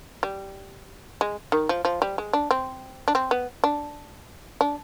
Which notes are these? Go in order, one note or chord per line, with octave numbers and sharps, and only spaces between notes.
G3
G#3
D#3
F3
F3
G3
G#3
D4
C4
D4
C4
B3
D4
D4